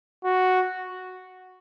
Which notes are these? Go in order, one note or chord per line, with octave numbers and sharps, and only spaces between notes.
F#4